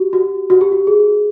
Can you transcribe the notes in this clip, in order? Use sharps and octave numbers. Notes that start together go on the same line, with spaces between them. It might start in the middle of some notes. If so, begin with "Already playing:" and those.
Already playing: F#4 G4
F#4
F#4
G4
F#4
G#4